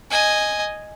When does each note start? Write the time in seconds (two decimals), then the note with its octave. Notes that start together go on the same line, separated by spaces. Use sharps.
0.10 D#5 G#5